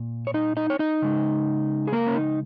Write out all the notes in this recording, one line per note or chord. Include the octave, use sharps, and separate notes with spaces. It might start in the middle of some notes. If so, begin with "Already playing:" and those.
Already playing: A#2
C#5
D#4 D#5
D#4 D#5
C#5
D#4 D#5
C#3 G#3
G#4
A#3 A#4
C#4
D#4